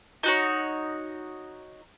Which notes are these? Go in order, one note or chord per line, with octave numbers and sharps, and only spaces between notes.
D#4 F#4 C#5